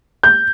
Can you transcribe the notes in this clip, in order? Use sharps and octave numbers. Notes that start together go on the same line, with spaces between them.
G6